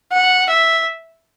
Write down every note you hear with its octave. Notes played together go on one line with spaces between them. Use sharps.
F#5
E5